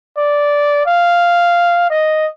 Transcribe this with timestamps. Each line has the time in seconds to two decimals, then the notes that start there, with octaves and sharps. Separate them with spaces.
0.17 D5
0.86 F5
1.90 D#5